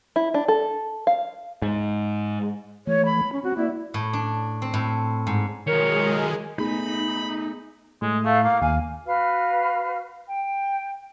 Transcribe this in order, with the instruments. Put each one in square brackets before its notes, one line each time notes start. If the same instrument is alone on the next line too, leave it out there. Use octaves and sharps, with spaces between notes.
[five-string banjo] E4
D4
A4
F5
[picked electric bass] G#2
[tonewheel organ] E3 A3 [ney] C#5
[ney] B5
C#4
[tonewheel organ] C4 [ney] F#4
[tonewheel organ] A#3 D5 [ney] E4
[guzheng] A2
D4
C4
A2
G#2
[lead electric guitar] D#3 F#3 [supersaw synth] G#3 G#4 [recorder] A#4 [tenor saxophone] C#5
[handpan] A3 B3 G#4 [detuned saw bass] D#4 [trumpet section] B5
[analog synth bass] A2 [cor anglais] G#3
[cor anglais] A3 [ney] F5
[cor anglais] A#3 [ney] F5
[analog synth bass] D#2 [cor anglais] F5 [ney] G#5
[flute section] F#4 B4 F5 F6
G5